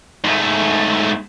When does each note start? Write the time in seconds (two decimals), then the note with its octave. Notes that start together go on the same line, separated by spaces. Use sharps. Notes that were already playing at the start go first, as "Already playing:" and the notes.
0.24 G#2 A3